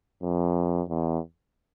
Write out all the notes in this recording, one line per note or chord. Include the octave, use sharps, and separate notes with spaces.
F2
E2